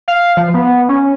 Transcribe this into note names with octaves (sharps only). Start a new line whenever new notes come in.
F5
F3
B3
C#4